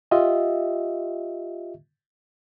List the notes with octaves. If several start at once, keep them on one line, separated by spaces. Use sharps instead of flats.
F4 G4 D#5 E5